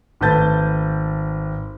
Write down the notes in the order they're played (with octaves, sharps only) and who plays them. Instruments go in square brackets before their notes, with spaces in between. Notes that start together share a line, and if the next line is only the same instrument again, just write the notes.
[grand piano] G#1 A3 B4 A5 G6 A6